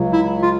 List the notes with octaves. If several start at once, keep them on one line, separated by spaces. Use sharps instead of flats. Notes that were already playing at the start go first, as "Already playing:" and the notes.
Already playing: C#2 C#3 F#3
E4
F4